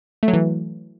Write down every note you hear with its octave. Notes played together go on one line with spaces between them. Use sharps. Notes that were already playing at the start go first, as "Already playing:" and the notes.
A3
F#3
E3